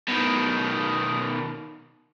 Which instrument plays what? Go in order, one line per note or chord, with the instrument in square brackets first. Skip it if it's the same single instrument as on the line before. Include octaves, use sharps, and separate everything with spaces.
[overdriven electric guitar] B2 D#3